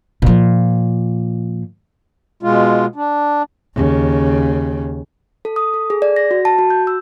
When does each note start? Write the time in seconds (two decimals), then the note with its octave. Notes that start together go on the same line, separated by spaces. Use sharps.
0.22 A#2 F3
2.43 B2 G#3 F4
2.96 D4
3.75 D#2 C#3
5.45 A4
5.56 D#6
5.74 A4
5.90 G#4
6.02 D5
6.16 A#6
6.31 F#4
6.45 A5
6.58 F#4
6.70 G6
6.87 E6